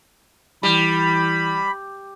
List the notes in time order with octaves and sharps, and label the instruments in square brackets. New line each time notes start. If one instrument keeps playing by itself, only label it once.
[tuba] E3 [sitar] G3 [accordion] B5